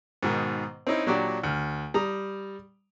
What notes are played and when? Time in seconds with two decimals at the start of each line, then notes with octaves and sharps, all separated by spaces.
0.23 G#2 B2 D#3
0.87 C4 C#4 D#4 E4
1.06 A#2 F#3 D4 F#4 G4
1.43 D2 F6
1.94 G3 A#5 D#6